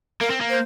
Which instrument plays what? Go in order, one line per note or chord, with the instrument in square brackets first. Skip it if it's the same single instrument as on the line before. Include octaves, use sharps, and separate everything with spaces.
[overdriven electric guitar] A#3 [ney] A#4
[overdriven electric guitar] C4
A#3
[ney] C5